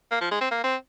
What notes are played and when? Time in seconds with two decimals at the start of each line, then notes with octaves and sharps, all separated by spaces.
0.11 A#3
0.21 F3
0.31 G#3
0.41 C4
0.51 A#3
0.64 C4